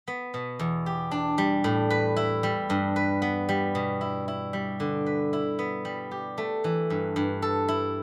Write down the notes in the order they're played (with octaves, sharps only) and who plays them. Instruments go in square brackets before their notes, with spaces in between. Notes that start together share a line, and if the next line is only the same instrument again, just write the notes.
[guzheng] B3
B2
E2
G4
D4
G3
A2
B4
E4
G3
G2
B4
B3
G3
B2
E4
E4
G3
D3
B4
E4
B3
G3
G4
A3
E3
G2
G2
A4
E4